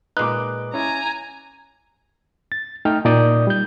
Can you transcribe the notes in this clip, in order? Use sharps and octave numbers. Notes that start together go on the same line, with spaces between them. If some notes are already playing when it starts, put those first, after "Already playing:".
A#2 G#3 D#4 B4 D6 F#6
C#4 E4 G#5 A#5
A6
A3 D#4 G5 F6
A#2 D#4 D5 D#6 G6
G3 G6